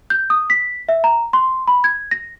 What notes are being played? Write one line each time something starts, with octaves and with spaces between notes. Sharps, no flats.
G6
D#6
B6
E5
A#5
C6
B5
G#6
A#6